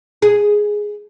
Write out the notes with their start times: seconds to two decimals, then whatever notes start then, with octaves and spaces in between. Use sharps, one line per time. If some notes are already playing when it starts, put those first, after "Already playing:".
0.22 G#4